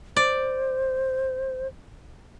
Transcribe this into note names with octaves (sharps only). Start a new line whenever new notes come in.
C5 D5